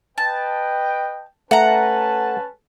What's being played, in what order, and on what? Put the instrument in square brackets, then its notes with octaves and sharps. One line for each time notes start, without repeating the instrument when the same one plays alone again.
[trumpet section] B4 D#5 G5 [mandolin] A5
[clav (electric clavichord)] A3 [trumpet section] C#4 B4 A5 [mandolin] F#5 A#5